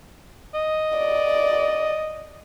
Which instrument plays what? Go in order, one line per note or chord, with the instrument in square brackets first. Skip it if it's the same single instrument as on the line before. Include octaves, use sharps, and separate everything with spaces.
[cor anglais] D#5
[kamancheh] D5